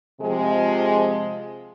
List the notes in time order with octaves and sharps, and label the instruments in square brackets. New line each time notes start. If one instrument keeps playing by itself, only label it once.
[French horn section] C3 F3 G#3